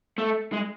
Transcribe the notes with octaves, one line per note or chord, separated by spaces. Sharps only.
A3
G#3